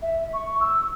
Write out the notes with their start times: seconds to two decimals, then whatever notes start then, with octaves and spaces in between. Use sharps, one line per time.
0.02 E5
0.33 C#6
0.60 E6